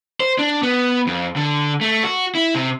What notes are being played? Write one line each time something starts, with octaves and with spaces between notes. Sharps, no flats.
C5
D4
B3
F2
D3
A3
F#4
E4
C3